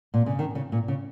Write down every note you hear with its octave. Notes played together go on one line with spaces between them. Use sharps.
A#2
C#3
D#3
C#3
A#2
C#3